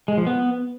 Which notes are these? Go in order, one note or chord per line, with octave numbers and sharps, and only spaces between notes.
G#3
F3
B3